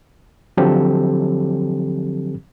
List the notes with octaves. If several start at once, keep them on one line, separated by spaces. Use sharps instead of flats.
D3 F3 F#3 C4 G4 A4